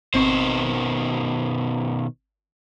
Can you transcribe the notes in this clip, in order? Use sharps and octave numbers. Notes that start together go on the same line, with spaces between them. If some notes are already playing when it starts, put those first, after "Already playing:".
G#1 B2 D#3 C4 C5 C#6